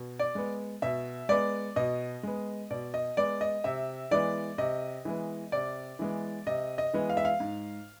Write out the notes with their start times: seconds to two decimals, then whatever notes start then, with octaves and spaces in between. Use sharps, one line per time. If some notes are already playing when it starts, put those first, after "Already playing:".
Already playing: B2
0.19 D5
0.35 G#3 B3
0.82 B2 E5
1.29 G#3 B3 D5
1.76 B2 D#5
2.23 G#3 B3
2.70 B2 D5
2.94 D#5
3.17 G#3 B3 D5
3.41 D#5
3.64 C3 E5
4.11 E3 G#3 B3 D5
4.58 C3 D#5
5.05 E3 G#3 B3
5.52 C3 D5
5.99 E3 G#3 B3
6.47 C3 D#5
6.78 D#5
6.94 E3 G#3 B3
7.09 F5
7.17 E5
7.25 F5
7.40 G#2